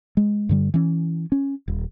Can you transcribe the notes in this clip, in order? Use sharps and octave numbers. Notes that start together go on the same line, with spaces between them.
G#3
G2 D3 G3
E3 C#4
C#4
D#1